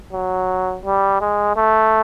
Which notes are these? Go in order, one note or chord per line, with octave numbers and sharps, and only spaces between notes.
F#3
G3
G#3
A3